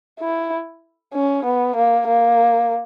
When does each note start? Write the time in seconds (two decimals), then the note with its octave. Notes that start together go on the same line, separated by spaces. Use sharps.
0.20 E4
1.14 C#4
1.45 B3
1.76 A#3
2.07 A#3